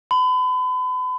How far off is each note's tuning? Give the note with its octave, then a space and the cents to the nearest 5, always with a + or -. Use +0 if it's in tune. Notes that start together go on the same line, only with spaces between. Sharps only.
B5 +40